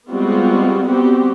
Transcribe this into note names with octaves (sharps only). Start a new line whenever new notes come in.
G3 G#3 B3 C4 F4 F#4
G3 B3 C4 F#4 G4